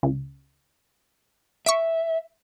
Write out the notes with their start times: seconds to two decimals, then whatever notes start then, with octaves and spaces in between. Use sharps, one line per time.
0.03 C#2
1.66 E5 C#6 B6 D7